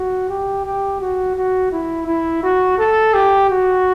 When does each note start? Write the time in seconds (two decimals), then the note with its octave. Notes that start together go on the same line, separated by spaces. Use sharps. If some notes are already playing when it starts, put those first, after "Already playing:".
Already playing: F#4
0.29 G4
0.65 G4
1.00 F#4
1.36 F#4
1.72 E4
2.07 E4
2.43 F#4
2.78 A4
3.14 G4
3.50 F#4